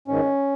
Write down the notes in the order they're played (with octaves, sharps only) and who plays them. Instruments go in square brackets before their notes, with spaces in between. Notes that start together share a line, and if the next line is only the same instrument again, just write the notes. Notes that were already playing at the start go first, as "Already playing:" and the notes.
[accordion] G#2 D#3 C#4